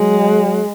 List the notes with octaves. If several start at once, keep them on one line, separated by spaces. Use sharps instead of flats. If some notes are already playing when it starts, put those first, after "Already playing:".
Already playing: F#3 G#3